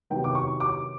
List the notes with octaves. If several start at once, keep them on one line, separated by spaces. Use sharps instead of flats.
C3 D#3 F#3 B3 G5
D6
C#6
D6